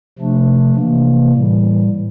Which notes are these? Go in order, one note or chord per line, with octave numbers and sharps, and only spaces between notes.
C3 F3 A3 D4
C3 E3 A#3
A2 E3 G3